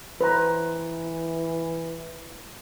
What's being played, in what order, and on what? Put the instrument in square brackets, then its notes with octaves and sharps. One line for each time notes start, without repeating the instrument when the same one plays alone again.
[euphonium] E3 [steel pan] B4 C5 A#5